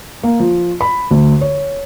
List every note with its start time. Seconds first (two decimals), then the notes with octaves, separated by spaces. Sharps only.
0.24 A#3
0.40 F3
0.81 B5
1.11 D2
1.41 C#5